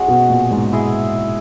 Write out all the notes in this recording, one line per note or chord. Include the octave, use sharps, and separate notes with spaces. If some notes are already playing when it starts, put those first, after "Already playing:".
Already playing: G#3 C#4 F#4
B2
A#2
G#2
E4 G#4 D#5